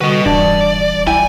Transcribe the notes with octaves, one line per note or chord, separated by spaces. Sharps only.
D3 G3 F#4 B4 D#5
D#1 G2 E3 D5 A5
B1 E4 G5 G#5